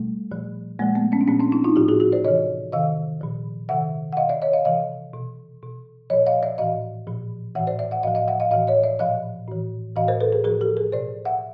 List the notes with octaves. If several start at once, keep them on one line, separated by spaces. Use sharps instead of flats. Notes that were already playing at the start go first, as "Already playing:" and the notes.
Already playing: B2 G3 A3
A#2 F3
A#2 F3 G#3 A#3
A3 B3
B3 C#4
D4
A#2 F3 B3 C#4
C4 D4
D4 E4
D#4 F4
A2 F3 F4 G4
F#4 G#4
F#4 G#4
C5 D5
C3 E3 C#5 D#5
C3 D#3 D#5 F5
A#2 F3
C3 D#3 E5 F#5
F#5
B2 D#5 F5
D5 E5
C#5 D#5
D#5 F5
C3 E3 D#5 F5
B2
B2
A#2 F3 C#5 D#5
D#5 F5
D5 E5
A2 E3 D#5 F5
A#2 F3
A2 E3 E5 F#5
C5 D5
D5 E5
E5 F#5
A2 F3 D#5 F5
D#5 F5
E5 F#5
D#5 F5
A2 E3 D#5 F5
C#5 D#5
D5 E5
A#2 F3 D#5 F5
A2 E3
A2 E3 D#5 F5
A#4 C5
A4 B4
G#4 A#4
A2 F3 G#4 A#4
G4 A4
G#4 A#4
B2 C5 D5
E5 F#5